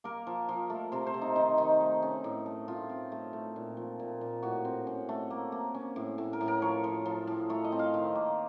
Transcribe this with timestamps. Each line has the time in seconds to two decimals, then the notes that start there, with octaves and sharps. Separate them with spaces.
0.04 A#3 A#4
0.27 F3
0.49 F3
0.70 A3
0.92 C3 C5
1.07 C5
1.14 C3
1.22 D#4
1.36 D#3 D#4
1.58 D#3 D#4
1.80 A3
2.03 C#4
2.24 A2
2.46 A3
2.68 C4 F4
2.89 C4
3.12 A3
3.33 A3
3.56 A#2
3.77 F3
3.99 A#2
4.21 A#2
4.43 A2 F#4
4.65 C4
4.87 C#4
5.09 A3
5.30 A#3
5.52 A#3
5.74 C#4
5.96 A2
6.18 A2
6.33 A#4
6.41 A2
6.48 A#4
6.62 F3 C#5
6.84 F3
7.05 F3
7.27 A2
7.50 A3 C#5
7.64 D#5
7.72 C4
7.79 F5
7.94 D#3
8.15 A#3